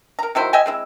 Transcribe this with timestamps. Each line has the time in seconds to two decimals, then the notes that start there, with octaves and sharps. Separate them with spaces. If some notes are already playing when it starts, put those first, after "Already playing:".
0.19 A#4 A#5
0.35 D#3 F#3 E4 C5
0.53 D#5 E5 G5 G#5
0.66 G#3 C4 E4